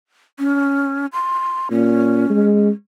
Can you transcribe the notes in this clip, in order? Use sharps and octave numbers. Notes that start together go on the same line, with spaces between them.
C#4
C6
A#2 C#4
G#3